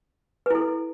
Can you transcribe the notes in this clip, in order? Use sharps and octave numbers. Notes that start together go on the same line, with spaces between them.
E4 A4 B4